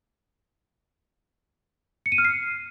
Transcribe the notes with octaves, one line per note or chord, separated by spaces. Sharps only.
C#7
D#7
F6
C7